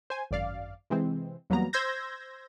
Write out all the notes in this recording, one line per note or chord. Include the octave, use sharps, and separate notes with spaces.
C5 G#5
G#1 F#2 D5 F5
C3 E3 G#3 C4
E2 F#3 G3 A#3 B3 A#5
C5 C6 E6 G6 G#6 A#6